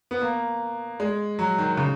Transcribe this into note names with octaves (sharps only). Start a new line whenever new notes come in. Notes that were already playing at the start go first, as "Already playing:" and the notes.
B3
A#3
G#3
F#3
D#3
C#3